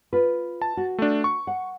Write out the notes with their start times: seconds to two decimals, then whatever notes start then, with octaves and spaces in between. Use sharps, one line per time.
0.13 F4 B4
0.62 A5
0.77 F#4
0.98 A3 D4
1.24 C#6
1.47 F#5